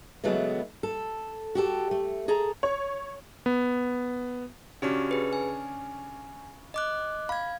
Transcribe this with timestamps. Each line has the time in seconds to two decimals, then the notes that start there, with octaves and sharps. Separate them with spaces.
0.24 C#3 E3 F#3 G#3 A3 B3
0.83 A4
1.55 F#4 G4 A4
1.91 A3
2.28 G#4 A4 A#5
2.63 C#5
3.46 B3
4.82 C#3 C#4 D4 F#4 G4
5.11 G#4 B4
5.33 G#5
6.74 D#5 D6 F#6
7.29 F5 B5 G#6